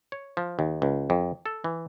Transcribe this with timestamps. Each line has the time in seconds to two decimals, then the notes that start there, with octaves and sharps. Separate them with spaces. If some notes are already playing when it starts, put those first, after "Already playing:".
0.12 C#5
0.37 F3
0.59 D#2
0.82 C#2
1.10 F2
1.46 A4
1.64 E3